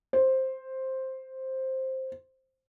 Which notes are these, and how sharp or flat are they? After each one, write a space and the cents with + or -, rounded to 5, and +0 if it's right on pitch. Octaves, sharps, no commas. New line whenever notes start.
C5 +5